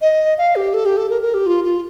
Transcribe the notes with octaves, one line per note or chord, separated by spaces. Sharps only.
D#5
F5
G4
A4
G4
A4
A#4
A#4
G4
F4
F4